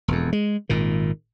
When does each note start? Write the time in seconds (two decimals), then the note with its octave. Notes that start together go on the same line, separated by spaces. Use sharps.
0.08 E1 F2
0.33 G#3
0.69 G#1 A#2 D#3